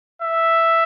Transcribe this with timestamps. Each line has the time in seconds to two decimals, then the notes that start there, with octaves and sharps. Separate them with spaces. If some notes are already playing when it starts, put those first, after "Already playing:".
0.22 E5